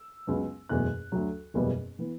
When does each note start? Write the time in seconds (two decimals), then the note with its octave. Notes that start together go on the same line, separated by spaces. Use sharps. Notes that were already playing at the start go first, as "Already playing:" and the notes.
Already playing: E6
0.27 C#2 C#3 F#3 B3
0.69 F#1 E2 B2 A3 F#6
1.12 D2 D3 F#3
1.54 F#1 E2 B2 G3 B3
1.99 E3 B3